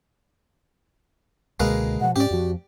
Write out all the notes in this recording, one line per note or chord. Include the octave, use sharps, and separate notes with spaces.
C#2 B2 D3 G#3 A#3 B4
B2 F3 F#5
G#2 C#4 G4 D5
F2 F3 F#4